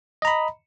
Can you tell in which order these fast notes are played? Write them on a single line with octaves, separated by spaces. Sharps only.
D#5 A#5 B5